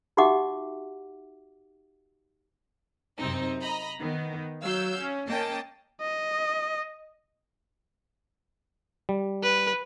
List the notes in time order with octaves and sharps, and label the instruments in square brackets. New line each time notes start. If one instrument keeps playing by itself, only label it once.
[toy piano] D#4 F#4 G4 E5 F#5 D6
[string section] F#2 C3 C4 D#4
D#5 A#5 B5
D#3 B3
F#3 F5 E6 G6
C#4
A#3 C#4 D#5 G5 A5
[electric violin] D#5
[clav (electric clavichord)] G3
[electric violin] B4